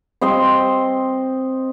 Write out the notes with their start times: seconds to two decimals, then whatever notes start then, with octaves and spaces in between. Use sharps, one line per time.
0.22 C4 D#5 C6